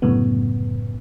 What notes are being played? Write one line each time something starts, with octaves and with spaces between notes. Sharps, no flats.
C2 F#2 A2 C#3 B3